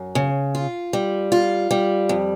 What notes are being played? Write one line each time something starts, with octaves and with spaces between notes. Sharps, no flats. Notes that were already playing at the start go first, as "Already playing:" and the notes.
Already playing: F#2
C#3
F4
G3
F4
G3
F2